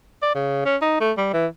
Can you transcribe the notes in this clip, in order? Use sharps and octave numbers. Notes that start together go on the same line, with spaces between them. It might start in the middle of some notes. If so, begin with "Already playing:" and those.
D5
C#3
C#4
D#4
A3
G3
E3